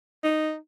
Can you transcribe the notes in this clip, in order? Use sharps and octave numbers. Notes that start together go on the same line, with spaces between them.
D#4